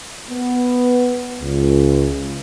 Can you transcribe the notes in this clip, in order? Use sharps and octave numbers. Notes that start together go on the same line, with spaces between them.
B3
C#2